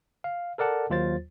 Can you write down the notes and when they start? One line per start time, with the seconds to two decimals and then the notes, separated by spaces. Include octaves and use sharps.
0.24 F5
0.58 A4 A#4 D5 F#5 A5
0.90 D#2 F#3 F4 C5 A6